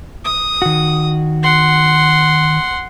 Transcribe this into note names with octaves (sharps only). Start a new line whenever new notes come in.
D#6
D#3 F#4
F#5 C6